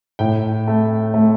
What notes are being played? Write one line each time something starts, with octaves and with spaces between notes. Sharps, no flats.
A2 G5
A3
A3